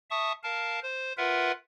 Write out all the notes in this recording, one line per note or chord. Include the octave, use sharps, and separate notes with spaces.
E5 A5 C#6 D#6
A#4 F5 A5
C5
F4 A#4 B4 E5 F#5